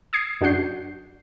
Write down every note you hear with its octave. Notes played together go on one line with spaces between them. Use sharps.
D#6 G#6 C7
F#2 D4 F#4 F#5 G6 C7